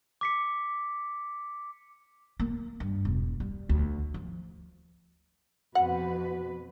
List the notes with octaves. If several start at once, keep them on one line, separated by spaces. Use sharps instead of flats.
D6 B6 C#7
A#3
G2
E1
G3
D2
F3
F2 B2 F#4 B4 F#5